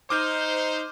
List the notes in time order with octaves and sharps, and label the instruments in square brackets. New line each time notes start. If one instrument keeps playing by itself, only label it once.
[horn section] D#4 C5 [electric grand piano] D6 F6 G6